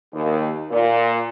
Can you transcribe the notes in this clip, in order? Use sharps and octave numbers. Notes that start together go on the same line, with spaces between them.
D#2
A#2